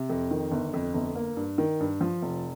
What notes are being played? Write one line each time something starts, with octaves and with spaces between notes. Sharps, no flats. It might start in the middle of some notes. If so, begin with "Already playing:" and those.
Already playing: C3
F2
D#3
G1
F2
G1
A#3
G2
D#3
G2
F3
F1